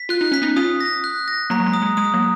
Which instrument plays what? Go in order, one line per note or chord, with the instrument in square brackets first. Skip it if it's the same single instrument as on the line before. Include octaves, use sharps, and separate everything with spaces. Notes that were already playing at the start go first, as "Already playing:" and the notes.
Already playing: [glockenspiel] B6
[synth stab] F4 [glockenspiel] F#6
[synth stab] D#4
[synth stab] C#4 [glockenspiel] B6
[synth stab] B3 D#4
[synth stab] C#4 F4 [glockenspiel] D#6
[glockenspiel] A#6
F#6
A#6
[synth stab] F#3 A#3 [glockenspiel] A#5
[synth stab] F#3
G#3
[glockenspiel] D#6
[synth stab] G#3
[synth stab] G#3 [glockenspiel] D#6
[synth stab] F#3 A#3